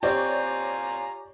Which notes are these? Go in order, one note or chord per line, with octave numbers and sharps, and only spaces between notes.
C4 F4 G4 C#5 D5 G#5 A#5